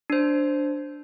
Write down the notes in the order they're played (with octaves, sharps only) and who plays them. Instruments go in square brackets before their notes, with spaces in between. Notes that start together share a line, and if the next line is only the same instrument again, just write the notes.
[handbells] D4 C5